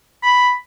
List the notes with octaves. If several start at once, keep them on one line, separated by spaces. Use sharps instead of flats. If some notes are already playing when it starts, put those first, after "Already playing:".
B5